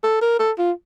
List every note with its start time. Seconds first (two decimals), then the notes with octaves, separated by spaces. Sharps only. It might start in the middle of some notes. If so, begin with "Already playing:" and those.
0.04 A4
0.22 A#4
0.39 A4
0.59 F4